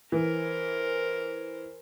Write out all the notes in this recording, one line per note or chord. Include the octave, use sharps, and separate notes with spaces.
E3 A#4 C5